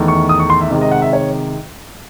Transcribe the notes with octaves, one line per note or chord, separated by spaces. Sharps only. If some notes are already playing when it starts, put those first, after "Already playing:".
Already playing: E2 D#3 A3
C#6
D#6
C#6
C6
E5
C3 D#3 G#3 D#5
D#5
F#5
E5
C#5